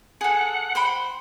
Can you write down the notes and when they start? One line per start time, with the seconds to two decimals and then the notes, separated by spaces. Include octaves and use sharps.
0.21 G#4 A4 F#5
0.75 C5 G5 B5